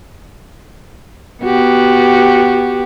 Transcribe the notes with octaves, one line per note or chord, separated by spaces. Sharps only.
B3 F#4 G4